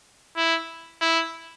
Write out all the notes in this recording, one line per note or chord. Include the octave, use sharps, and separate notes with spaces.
E4
E4